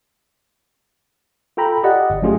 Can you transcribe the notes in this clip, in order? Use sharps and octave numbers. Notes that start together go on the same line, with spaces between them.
F4 A4 G5 A#5 B5
G4 D5 D#5 F#5
G1
F#3 A3 C#4 F4 G4 G#4